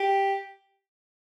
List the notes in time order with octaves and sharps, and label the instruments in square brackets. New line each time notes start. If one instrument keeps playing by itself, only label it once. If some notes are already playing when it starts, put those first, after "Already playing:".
Already playing: [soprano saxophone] G4